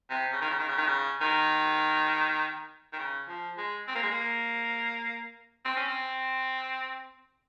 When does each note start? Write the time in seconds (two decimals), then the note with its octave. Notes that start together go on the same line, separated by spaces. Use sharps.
0.10 C3
0.32 C#3
0.41 D#3
0.50 C#3
0.59 D#3
0.69 C#3
0.77 D#3
0.86 C#3
1.21 D#3
2.93 D#3
2.99 C#3
3.28 F3
3.57 G#3
3.87 C4
3.95 A#3
4.03 G#3
4.11 A#3
5.65 C4
5.76 C#4
5.88 C4